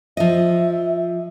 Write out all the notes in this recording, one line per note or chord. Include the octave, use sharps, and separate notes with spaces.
F3 D#5 E5